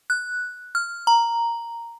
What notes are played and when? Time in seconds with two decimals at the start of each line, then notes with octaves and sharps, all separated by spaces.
0.10 F#6
0.75 F6
1.07 A#5